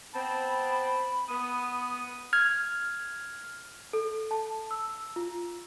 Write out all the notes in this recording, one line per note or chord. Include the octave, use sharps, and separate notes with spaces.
B3 C4 A5 B5
B3 D#6
F6 G#6
A4
A5
E6
F4